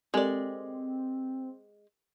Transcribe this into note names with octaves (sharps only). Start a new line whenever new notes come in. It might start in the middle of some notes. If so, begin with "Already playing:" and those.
G#3 C4 G4 A4 A#4 D5